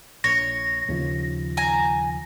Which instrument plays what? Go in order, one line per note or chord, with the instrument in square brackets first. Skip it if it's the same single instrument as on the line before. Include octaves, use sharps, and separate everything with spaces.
[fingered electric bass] A#1 [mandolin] C#5 [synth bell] A#6
[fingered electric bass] D#2 C#3 F3
[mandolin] G#5 A#5